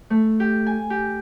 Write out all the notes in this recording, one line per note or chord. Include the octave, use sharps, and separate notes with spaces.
A3
G4
G#5
G4